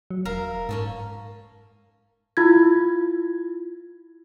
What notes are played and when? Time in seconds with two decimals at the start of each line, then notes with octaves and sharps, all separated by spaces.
0.11 F#3
0.25 E1 A#4 E5 F5
0.69 G#2 A#3 C#4 A4
2.37 E4 F4 G#6